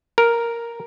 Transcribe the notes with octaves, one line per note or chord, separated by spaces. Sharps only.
A#4